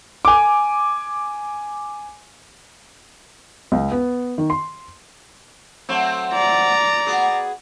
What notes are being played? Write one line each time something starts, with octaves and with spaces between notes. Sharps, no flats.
G#5 D6
C#2
B3
D#3
C6
F#3 A3 C4
D5 A#5
B3 F#4 G#4